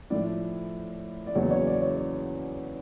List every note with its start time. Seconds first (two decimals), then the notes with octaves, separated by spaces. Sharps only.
0.10 A2 F3 A3 D5
1.26 D5
1.35 E2 C#3 F#3 A#3 C#5
1.51 C#5
1.67 D5
1.82 C#5